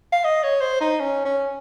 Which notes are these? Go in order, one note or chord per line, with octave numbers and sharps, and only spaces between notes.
F5
D#5
C#5
C5
D#4
C#4
C#4